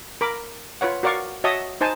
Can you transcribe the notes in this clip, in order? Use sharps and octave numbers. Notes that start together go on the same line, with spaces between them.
A#4 B5 D6
F4 B4 C#5 F#5
F#4 A#4 D5 F5 C#6
F#4 C#5 D#5 E5 A5 D#6
D#4 C5 G#5 A5